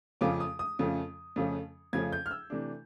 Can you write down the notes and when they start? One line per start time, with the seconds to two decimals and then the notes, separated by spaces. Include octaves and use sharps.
0.21 F2 C#3 F3 A3 C#4 D6
0.40 D#6
0.59 D#6
0.79 F2 C#3 F3 A3 C#4
1.36 F2 C#3 F3 A3 C#4
1.93 F2 C#3 F3 A3 C#4 G#6
2.13 G6
2.26 F6
2.31 E6
2.50 C3 E3 A3 D4